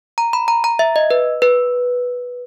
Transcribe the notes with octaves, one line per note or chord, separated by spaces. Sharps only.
A#5
B5
A#5
A#5
E5
D#5
B4
B4